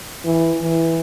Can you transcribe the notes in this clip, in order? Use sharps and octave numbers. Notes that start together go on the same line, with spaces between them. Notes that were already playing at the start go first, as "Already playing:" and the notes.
E3
E3